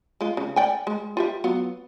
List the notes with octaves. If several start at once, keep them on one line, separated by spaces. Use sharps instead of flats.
G#3 F4
C#3
D5 G5 G#5
G#3
F4 G4 E5
F#3 B3 F4